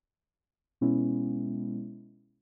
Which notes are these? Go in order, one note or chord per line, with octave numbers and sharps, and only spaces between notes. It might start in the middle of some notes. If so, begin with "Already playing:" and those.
B2 G#3 B3 C#4 E4